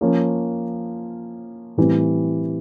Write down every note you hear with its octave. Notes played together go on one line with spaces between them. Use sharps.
F3 A#3 C#4
A2 E3 G3 C4